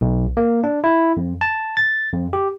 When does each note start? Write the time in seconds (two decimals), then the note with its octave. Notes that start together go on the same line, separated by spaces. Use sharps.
0.01 B1
0.37 A#3
0.64 D4
0.84 E4
1.17 F2
1.41 A5
1.77 A6
2.13 F2
2.33 G4